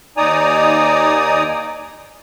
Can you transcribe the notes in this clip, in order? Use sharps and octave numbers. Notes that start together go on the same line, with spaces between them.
D#2 D#4 D5 G#5 A#5 D#6